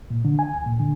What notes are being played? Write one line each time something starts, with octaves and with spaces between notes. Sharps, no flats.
A#2
D3
G#5
D2
A#2
D3